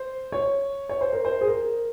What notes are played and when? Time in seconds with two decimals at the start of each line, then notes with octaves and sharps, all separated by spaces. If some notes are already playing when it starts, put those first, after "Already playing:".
Already playing: C5
0.32 C#5
0.89 C#5
1.01 C5
1.13 A#4
1.25 C5
1.41 G#4
1.48 A#4